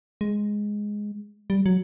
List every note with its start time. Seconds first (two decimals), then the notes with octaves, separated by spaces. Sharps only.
0.21 G#3
1.50 G3
1.66 F#3